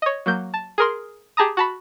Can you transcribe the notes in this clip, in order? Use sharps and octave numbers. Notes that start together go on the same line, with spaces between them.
C#5 D#5
F#3 A#3 G6
A5
G#4 A#4 C6
G4 G#4 A5 A#5 D#6
F#4 A5 B5